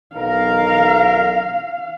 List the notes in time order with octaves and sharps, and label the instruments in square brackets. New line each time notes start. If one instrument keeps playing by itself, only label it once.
[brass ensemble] B1 A#4 [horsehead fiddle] F5